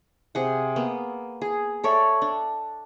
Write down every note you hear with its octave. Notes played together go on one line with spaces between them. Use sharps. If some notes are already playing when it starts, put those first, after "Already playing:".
C3 G#4 F#5
A#3 B3
G#4
A4 C#5 D5 E5
D4